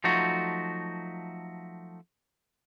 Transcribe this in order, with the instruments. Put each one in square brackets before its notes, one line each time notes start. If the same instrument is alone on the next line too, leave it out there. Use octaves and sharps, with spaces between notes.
[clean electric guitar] F3 F#3 A3 D#4 F#4